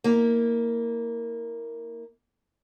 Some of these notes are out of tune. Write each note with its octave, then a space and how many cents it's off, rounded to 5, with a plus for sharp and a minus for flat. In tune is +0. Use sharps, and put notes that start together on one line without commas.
A#3 -5 E4 -25